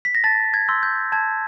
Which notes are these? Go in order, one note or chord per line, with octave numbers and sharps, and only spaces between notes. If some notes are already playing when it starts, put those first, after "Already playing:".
B6
A#6
A5 A6
G#6
C6 E6 G6
G6
A5 G#6